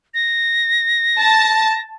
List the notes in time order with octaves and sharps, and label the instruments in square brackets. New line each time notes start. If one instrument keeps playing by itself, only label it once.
[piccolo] A#6
[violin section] A5